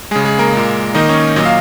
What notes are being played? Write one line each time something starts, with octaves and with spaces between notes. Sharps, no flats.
C#3 G#3 G#4
G#3 G#4
A#3 A#4
A#2 G#3
D#3 A#3 D#4 D#5
C#4 C#5
A#2 F#3 A#3 D#5
F5